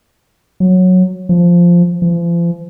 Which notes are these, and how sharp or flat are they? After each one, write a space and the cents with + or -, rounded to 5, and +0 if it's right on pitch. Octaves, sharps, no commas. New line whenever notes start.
F#3 -10
F3 -5
F3 -40